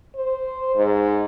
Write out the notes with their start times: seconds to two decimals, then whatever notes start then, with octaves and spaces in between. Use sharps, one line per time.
0.16 C5
0.76 G#2